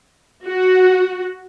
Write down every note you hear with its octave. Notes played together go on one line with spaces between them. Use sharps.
F#4